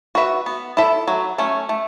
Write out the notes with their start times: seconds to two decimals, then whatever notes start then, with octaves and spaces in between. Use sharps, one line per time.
0.15 F#4 B4 E5
0.46 B3
0.77 E4 A4 E5
1.08 F#3
1.38 A3 C#4
1.69 A3